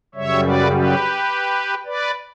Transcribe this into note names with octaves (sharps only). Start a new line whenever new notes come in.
F#2 C#3 G3 C#5 E5
B4 D5
G4 B4
B4 D5